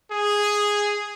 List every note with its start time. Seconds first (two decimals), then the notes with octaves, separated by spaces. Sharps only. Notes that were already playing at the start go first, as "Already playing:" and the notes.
0.12 G#4